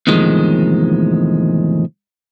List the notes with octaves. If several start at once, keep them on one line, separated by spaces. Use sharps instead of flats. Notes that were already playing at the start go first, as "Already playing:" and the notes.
E2 A2 C3 D#3 F3 G#3